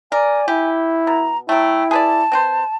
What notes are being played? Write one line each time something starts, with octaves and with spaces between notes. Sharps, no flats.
A#4 D5 G#5
E4 G4
B2 A#5
F#3 A3 E4 G5
G#4 B4 D5 A5
C4 B4 C5